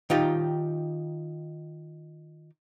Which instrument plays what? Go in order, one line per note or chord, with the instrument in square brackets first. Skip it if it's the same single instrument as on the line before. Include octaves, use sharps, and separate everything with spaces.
[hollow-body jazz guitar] D#3 D#4 F4 G4